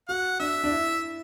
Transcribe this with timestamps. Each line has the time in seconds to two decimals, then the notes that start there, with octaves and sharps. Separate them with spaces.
0.08 F#4 F#5
0.40 D4 E5
0.64 D4
0.71 E4